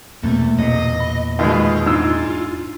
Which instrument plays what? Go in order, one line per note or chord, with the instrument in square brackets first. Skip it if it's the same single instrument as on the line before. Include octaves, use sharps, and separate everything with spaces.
[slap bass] E2 [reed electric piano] B2 A#3 [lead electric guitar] A3
[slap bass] E2 A#2 [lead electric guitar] D#5
[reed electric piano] B5
[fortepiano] D#2 B2 G#3 [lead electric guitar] F4
[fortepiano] G#2 E6 [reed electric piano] D4 E4